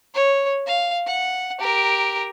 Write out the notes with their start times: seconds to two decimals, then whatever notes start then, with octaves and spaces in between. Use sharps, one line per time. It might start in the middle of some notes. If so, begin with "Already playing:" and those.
0.15 C#5
0.67 F5
1.06 F#5
1.60 G4 A#4